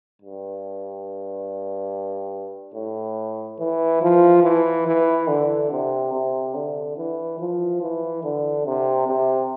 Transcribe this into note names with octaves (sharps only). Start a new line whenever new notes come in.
G2
A2
E3
F3
E3
E3
D3
C3
C3
D3
E3
F3
E3
D3
C3
C3